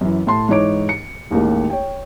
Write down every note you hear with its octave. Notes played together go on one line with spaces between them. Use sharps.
F#2 E3
A2 A5 C6
G#2 E3 D#4 C#5 D6 D7
C#7
A1 D#2 G#3 A#3
C#5 G5